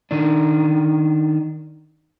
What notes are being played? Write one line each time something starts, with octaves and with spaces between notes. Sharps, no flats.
D#3 D4